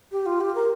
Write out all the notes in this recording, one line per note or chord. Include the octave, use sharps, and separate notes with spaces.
G4
F4
G4
A#4